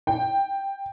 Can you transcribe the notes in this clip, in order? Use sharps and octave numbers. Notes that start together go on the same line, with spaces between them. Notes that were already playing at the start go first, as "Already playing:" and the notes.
G5